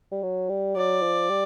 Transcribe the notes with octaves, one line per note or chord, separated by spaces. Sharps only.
G3
F#3
G3
F#3 D5
F3
G3